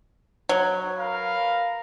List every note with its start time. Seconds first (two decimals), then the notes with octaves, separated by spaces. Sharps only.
0.49 F#3
0.98 A#4 B4 F5